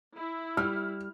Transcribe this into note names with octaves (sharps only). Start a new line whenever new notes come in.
E4
G3 F6